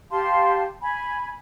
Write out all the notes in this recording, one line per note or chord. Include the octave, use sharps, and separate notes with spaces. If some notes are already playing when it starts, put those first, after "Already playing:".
G4 F5 A5 C6
G#5 B5